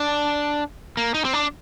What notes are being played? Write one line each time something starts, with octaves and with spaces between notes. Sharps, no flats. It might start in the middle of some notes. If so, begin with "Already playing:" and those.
Already playing: D4
A#3
D#4
C4
D4